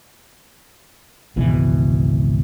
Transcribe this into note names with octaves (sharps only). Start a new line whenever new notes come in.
G#1 C#2 B2 E3